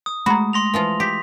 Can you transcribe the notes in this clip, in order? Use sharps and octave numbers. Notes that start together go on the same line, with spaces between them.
D#6
G#3 A3 F#4 A#5 B5
C6 A#6 F7
E3 F3 F4
G4 B6